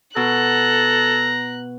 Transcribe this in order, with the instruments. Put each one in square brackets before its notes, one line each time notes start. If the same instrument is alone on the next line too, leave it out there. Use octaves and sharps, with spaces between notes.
[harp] B2 [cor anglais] A4 [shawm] A#5 [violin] F#6